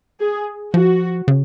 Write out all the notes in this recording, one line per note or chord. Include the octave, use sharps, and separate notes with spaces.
G#4
F3 F#4
C#3